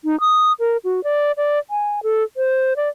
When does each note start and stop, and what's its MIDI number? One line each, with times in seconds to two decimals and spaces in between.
0.05 0.19 63
0.20 0.52 87
0.60 0.77 70
0.84 1.03 66
1.04 1.32 74
1.37 1.59 74
1.70 2.00 80
2.03 2.24 69
2.37 2.73 72
2.77 2.89 74